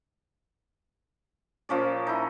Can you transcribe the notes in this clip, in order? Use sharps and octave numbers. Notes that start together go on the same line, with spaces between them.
A#2 F3 C#4 D5
D#4 E4